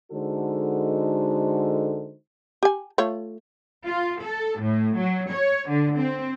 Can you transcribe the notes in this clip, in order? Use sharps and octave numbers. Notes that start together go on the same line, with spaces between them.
D3 G#3 D#4 F#4 A4 C5
G4 G#5
A3 F4 C#5
F4
A4
A2
F#3
C#5
D3
C4